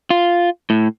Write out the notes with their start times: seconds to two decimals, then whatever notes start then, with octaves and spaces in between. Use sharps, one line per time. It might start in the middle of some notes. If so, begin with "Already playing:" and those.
0.10 F4
0.70 A2